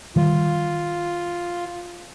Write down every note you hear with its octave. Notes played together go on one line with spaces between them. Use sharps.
D#3 G3 F4